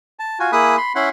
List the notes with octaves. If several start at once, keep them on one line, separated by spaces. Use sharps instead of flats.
A5
F4 F#4 G#5
A#3 E4 G#4 B5 D#6 F#6
B5 C6
C#4 E4 F#5 B5 C6